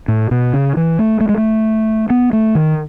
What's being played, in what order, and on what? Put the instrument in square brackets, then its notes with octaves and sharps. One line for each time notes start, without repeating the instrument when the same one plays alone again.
[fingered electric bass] A2
B2
C#3
E3
A3
A3
G#3
A3
B3
A3
D#3